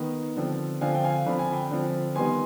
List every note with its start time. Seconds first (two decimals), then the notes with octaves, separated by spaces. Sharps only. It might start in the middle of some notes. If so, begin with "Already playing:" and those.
Already playing: D#3 B3
0.37 D3 F3 C4
0.81 D3 F3 C4 F5 G#5
0.95 G5
1.04 F5 G#5
1.26 D3 F3 C4 B5
1.39 G#5
1.52 G5 B5
1.71 D3 F3 C4
2.16 D#3 G3 B3 G#5 C6